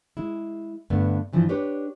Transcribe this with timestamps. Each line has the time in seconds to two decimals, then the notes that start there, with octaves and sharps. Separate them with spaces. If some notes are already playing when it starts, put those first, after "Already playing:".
0.17 G#3 E4
0.90 G2 D3 A3 B3
1.33 G2 E3 F3
1.49 D4 G4 B4 C#5